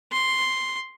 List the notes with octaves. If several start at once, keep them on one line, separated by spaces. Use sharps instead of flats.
C6